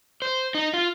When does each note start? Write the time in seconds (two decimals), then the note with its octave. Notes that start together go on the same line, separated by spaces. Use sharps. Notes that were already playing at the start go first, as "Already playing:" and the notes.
0.22 C5
0.54 D#4
0.73 F4